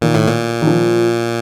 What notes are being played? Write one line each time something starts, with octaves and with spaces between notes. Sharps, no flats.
A#2 D#3
A2
A#2
D#3
F3